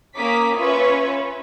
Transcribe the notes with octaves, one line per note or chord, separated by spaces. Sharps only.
A#3 C#4 D6 D#6 B6
C#4 F4 B4 C#5 E5